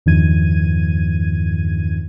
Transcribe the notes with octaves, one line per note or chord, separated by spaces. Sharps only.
E2 G2 D#3 F3 G#6 D#7